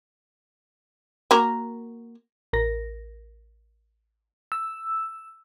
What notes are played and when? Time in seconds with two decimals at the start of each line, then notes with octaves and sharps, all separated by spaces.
1.31 A#3 F#4 A#4
2.53 A1 A#4 A#6
4.52 E6